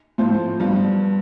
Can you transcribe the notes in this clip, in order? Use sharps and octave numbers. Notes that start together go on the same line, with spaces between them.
A2 F3 C4 F4 C5
G2 F3 B3 F4